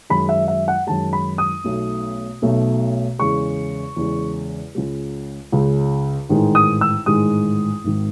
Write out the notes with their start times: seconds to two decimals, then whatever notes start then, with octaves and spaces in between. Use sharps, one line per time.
0.10 F#2 D#3 G#3 B5
0.29 E5
0.48 E5
0.68 F#5
0.87 F#2 D#3 G#3 A5
1.13 B5
1.38 D#6
1.64 B1 B2 A3
2.42 B1 B2 A3
3.19 E2 C#3 G#3 C#6
3.96 E2 C#3 G#3
4.75 C#2 C#3 G#3
5.52 C#2 C#3 G#3
6.29 A1 G#2 D#3 G#3
6.55 D#6
6.81 E6
7.06 A1 G#2 D#3 G#3 D#6
7.84 G#1 G#2 D#3